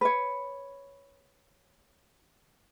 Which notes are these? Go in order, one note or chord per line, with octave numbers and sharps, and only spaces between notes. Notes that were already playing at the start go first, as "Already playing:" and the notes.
B4 C#5